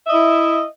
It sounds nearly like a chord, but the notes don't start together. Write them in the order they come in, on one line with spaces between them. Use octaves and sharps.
E5 D#5 E4